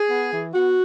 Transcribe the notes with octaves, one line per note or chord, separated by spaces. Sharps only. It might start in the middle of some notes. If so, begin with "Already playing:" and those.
Already playing: G#4
B3
E3
B3 F#4